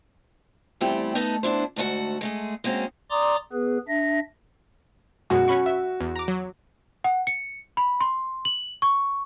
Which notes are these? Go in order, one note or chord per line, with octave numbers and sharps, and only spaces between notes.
E2 G3 A3 C4 E4 G4
A3 B3 D#4 A4
B3 D4 E4 C5
D2 G#2 A3 F#4 F#5
G#3 A3 G#4
G#3 A#3 C4 C#4 F#4
D5 A#5 C6 D6 D#6
B3 G#4 B4
D4 E5 A#6
F#2 B2 G#3 F#4
C#4 B5 C#6
E5
E2
A#5 D6
F#3
F#5
C#7
B5
C6
F#7
C#6